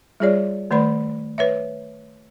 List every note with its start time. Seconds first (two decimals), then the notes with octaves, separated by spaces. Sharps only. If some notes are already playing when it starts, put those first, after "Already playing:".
0.20 G3 F4 G#4 C#5 D5
0.71 D#3 A3 B4 D5 B5
1.38 B4 C#5 E5